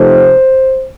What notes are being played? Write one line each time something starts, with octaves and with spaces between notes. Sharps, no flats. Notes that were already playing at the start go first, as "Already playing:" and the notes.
Already playing: C3 F3 A3 C4 D#4 C5